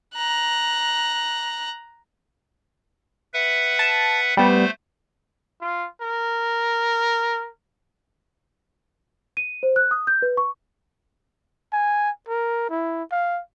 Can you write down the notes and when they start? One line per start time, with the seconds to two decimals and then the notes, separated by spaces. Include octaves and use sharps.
0.15 A#5 F#6
3.34 B4 E5 F#5
3.79 A5
4.37 G3 A3 B3 C5
5.61 F4
6.01 A#4
9.37 D#7
9.63 C5
9.76 F#6
9.91 D#6
10.07 G6
10.22 B4
10.37 C#6
11.73 G#5
12.28 A#4
12.69 E4
13.12 F5